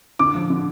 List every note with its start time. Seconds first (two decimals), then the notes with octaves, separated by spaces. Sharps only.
0.19 D3 D6
0.35 F3
0.50 D3